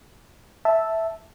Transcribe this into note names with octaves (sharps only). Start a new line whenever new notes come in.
E5 A5